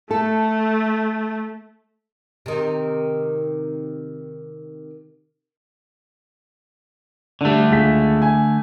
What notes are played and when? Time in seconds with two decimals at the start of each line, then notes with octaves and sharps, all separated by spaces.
0.11 A3 A4
2.46 C3 D#3
7.41 D3 G3 A3 D4
7.70 C#2 G#4 B6
8.22 G#5